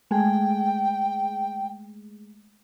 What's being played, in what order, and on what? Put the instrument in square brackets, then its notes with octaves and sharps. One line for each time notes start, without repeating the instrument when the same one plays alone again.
[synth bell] G#3 A3 G#4 [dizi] G5